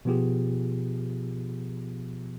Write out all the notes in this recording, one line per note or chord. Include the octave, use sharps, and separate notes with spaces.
B2 F3 B3 F4 G4 G#4